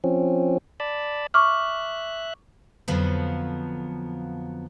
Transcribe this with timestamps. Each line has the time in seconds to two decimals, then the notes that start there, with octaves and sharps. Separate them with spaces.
0.04 F3 C4 C#4
0.80 D5 A5 B5
1.34 E5 C#6 D6 F6 F#6
2.88 F2 D3 F3 F#3 B3